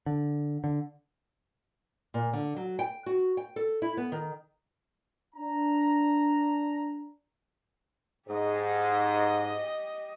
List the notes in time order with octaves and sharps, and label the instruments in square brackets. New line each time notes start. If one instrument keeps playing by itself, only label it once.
[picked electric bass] D3
D3
[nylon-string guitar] A#2
D3
F#3
G5
F#4
G5
A4
E4
B3
D#3
[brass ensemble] D4 A#5
[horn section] G#2 [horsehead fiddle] G4 D#5